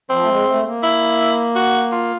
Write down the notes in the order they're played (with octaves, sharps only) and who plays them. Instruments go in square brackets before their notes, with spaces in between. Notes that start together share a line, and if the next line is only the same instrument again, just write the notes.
[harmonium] F3 [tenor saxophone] C4
[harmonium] A3
G#3
A3
A#3
[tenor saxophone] E4
F#4
F4